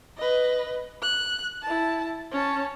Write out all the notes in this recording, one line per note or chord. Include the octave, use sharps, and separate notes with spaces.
B4 D#5
F#6
E4 A5
C#4 A5